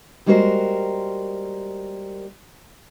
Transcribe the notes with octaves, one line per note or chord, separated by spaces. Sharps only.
G3 G#3 A#3 F#4 A#4 C5